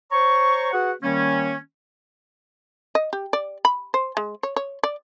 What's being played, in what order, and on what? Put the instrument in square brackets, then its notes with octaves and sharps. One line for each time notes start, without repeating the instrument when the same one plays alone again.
[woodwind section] C5 C#5 A#5 C#6
F#4 G#4 B4 F#5
D#3 G3 A#3 C#4
[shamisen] D#5
G4
D5
B5
C5
G#3
C#5
C#5
D5